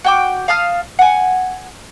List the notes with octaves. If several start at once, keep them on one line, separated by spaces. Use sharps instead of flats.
F#4 G5 D6
F5 A5 D#6 F6
F#5 G#5